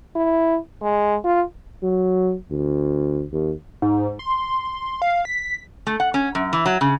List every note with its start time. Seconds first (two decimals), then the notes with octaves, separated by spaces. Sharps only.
0.16 E4
0.82 G#3
1.24 F4
1.83 F#3
2.51 D2
3.32 D#2
3.82 G#2
4.19 C6
5.02 F5
5.25 B6
5.87 A3
6.00 F#5
6.14 C#4
6.35 F#2
6.53 E3
6.66 F#3
6.81 C#3